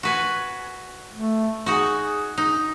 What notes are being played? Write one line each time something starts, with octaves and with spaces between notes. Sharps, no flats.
F#4 B4 G#5
A3
D#4 F#4 G#4
D#4